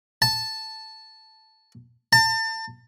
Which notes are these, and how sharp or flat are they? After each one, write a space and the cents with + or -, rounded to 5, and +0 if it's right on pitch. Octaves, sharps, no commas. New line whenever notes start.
A5 +0
A5 +35